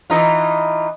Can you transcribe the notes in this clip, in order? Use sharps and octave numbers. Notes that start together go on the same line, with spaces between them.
E3 D#4 F4